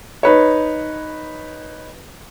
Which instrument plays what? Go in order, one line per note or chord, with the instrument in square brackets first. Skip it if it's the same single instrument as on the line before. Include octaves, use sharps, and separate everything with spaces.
[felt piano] D#4 B4 C#5